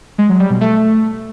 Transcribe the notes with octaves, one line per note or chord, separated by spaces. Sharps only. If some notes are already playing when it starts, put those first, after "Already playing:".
G#3
F#3
G3
B2
A3